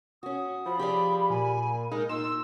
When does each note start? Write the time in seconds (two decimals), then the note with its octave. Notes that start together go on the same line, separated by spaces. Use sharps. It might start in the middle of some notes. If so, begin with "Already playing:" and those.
0.23 C#4 F#4 D#6
0.66 F3 B5
0.79 G4 G#4 D5
1.30 A#2 G#5
1.92 G#3 D#4 A#4
2.09 A#2 D#4 C6 E6